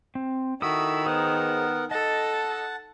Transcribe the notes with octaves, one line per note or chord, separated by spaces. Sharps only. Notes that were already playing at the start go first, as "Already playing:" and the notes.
C4
D#3 E4 F#4 A4 B5 D#6 E6
B3 G#4 A#4 C5 F#5 D#6
A4 D#5 F#5 A5